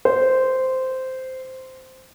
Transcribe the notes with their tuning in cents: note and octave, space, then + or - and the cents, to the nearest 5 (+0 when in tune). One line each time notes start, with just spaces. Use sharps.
C5 -10